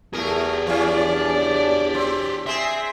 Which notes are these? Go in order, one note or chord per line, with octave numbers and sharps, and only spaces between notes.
E2 A3 G4 G#4 A#4
E3 C#4 D4 D5
C4
C4 G#4 E5